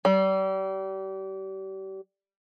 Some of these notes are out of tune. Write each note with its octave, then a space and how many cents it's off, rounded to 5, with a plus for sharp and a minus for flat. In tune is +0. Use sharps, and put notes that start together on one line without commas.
G3 -35